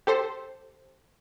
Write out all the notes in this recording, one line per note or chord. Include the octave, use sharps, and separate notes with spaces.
G4 A4 C5